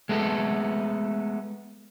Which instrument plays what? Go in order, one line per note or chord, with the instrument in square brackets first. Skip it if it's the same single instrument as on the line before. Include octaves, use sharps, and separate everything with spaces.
[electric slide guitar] G#3 A3 B3 A4